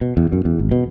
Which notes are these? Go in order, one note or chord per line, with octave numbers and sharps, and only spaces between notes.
B2
E2
F#2
E2
G#1
B2